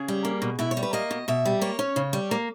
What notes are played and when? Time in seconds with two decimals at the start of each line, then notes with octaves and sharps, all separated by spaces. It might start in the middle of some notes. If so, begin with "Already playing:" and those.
Already playing: C#3 G#4
0.08 G3
0.25 A#3
0.42 B2
0.59 B2 E4
0.71 C#5
0.77 G3
0.83 B4
0.93 A#3 D#5
1.11 B2
1.28 B2 E5
1.45 G3
1.62 A#3 C#5
1.79 C#4
1.96 C#3
2.13 G3
2.31 A#3